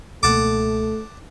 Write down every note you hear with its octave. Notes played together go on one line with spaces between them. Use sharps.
C#2 B2 A3 A#3 F#5 A5 D6